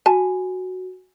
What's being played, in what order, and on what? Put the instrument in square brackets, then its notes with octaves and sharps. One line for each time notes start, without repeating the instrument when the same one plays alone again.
[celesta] F#4 [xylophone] G#5 [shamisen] A5